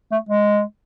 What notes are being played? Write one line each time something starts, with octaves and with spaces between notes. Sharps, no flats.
A3
G#3